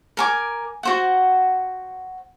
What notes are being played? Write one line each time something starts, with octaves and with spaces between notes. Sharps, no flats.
A#4 G#5 D6
F#4 C5 F#5